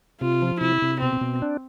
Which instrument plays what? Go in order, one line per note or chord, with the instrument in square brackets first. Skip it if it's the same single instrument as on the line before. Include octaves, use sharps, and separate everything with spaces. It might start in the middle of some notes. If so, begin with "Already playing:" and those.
[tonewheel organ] C3 [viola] F4
[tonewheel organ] F3
[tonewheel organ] C3 [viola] E4
[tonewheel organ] C3
[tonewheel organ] B2 [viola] C4
[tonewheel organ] B2
D4